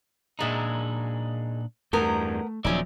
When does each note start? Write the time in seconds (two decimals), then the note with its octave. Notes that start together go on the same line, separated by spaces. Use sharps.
0.39 F#2 A#2 G#3 D4 D#4 E5
1.93 E2 G2 A3 B3 A#4
2.65 D#1 F3 F#3 C4 C#4 D#4 D5 E5